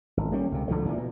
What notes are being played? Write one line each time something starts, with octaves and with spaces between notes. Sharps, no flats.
G#1
G3 A#3 C#4
C#2 C3
C#2 D3 F3 A3
A#2 D#3 E3
B2